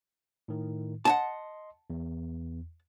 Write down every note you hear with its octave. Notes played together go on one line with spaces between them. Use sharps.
A2 D#3
D#5 F#5 G#5 A5 C6
E2